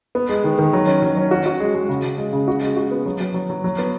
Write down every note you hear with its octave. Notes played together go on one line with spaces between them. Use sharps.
B3
G#3
D#3
D#3
F#3
C#4
F#3
C#4
F#4
F#4
G#3
G#3
C#3
C#3
G#3
C#3
F#4
G#3
F#4
B3
F#3
F#3
F#3
F#3
F#3
B3